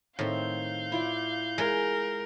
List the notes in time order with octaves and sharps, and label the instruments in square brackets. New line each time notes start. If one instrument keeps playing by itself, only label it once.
[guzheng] A2 [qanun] D#3 C4 [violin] F5 G6
[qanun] E4 F4 D5
[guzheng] G#3 [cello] A#4